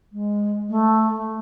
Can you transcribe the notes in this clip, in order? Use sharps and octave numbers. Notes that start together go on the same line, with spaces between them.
G#3
A3